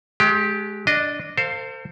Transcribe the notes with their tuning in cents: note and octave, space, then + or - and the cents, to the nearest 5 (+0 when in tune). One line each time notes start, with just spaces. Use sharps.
G#3 +30 G4 +0
D4 +0 D#5 -20
A4 +45 C5 +0 F5 +0